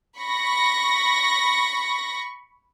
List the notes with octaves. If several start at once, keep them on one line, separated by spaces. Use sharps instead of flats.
B5 C#6 A#6